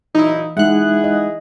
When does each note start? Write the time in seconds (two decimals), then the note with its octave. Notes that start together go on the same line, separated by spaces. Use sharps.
0.15 A#2 E3 F#3 D#4 E4
0.57 G#3 D#4 E4 G#4 E5 F#5 F#6
1.04 D#5